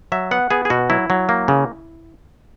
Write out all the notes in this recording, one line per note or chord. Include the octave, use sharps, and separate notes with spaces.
F#3 E5
B3 F#5
B3 G#4
G#4
B2 F#4
F#3 E4
F#3
A#3
C#3